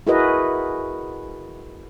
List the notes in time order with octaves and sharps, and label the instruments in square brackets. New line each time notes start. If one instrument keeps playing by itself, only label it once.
[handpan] E4 F#4 G#4 A#4 B4 D#5